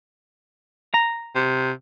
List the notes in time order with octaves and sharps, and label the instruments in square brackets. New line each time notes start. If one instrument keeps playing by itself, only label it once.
[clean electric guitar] A#5
[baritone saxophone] C3